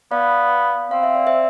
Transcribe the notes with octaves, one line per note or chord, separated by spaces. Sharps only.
B3 D5 F5
C4 F5
E5
D5
C5 E5